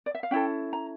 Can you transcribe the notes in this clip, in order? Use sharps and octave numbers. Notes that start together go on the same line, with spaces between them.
D5
E5
F5
C#4 E4 A4 G5
A#5